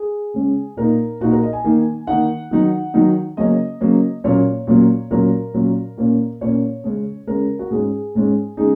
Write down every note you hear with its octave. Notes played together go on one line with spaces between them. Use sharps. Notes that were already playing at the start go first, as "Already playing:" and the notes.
Already playing: G#4
C#3 G#3 C#4
A#2 A#3 D#4 A#4
A#2 A#3 D#4 F#4
A#4
D#5
G#5
D#3 A#3 D#4
D#3 A#3 D#4 F#5
D#3 F#3 D#4
D#3 F#3 D#4
C#3 F#3 A#3 C#4 D#5
C#3 F#3 A#3 C#4
A#2 F#3 A#3 C#4 C#5
A#2 F#3 A#3 C#4
A#2 F#3 C#4 A#4
A#2 F#3 C#4
A#2 A#3 C#4
A#2 A#3 C#4 C#5
C#3 G#3 C#4
C#3 G#3 C#4 A#4
F#4
G#2 G#3 C#4 G#4
G#2 G#3 C#4
C#3 G#3 D#4 G#4